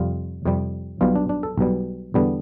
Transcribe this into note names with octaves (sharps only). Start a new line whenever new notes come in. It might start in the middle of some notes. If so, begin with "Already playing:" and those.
Already playing: F2 C3 G3 F4
F2 C3 G3
B1 B2 G3 F4
D4
D4
A4
B1 B2 G3
E2 D3 G3 B3